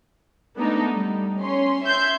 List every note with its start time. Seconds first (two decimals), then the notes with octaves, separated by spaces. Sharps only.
0.56 G#3 A3 B3 D4 D#4 A4
0.92 G3
1.40 C#4 C6
1.84 E5 C6 G6 G#6